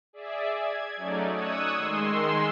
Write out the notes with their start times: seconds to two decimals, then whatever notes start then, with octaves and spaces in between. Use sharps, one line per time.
0.13 G#4 D5 E5
0.51 G#6
0.97 F#3 A3 C#4 D#4 D5
1.32 C#6 D#6 E6 F#6 G#6 D#7
1.76 D#3 G#3 C6 E6